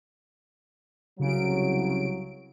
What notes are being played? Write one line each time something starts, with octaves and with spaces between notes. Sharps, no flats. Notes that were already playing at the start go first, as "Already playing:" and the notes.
C2 C#3 F#3 D7